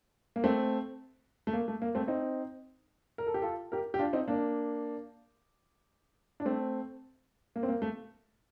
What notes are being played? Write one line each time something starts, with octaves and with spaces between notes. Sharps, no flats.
A#3
A3 C4
A3
A#3
A3
A#3
A3 C4
C4 D#4
A#4
A4
G4
F4 A4
G4 A#4
G4
D4 F4
C4 D#4
A#3 D4
D4
A3 C4
A#3
C4
A#3
A3